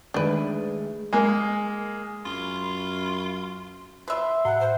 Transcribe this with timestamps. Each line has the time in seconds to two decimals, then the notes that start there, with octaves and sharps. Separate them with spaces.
0.14 D#3 G#3 A3 D4 B4
1.13 G#3 A#3
2.26 F#2 F4
4.08 B4 E5 C6
4.45 A2 F#5
4.61 C5